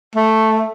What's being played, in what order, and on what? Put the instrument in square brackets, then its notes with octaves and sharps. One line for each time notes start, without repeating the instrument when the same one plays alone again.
[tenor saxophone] A3